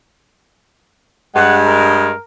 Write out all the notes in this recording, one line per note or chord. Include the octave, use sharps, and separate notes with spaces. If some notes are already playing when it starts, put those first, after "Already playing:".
G2 G#3 F#5
A#4